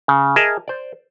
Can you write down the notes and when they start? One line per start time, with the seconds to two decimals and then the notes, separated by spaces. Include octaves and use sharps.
0.08 C#3
0.36 G#4 A#4 D#5 E5 A5
0.68 C5 D5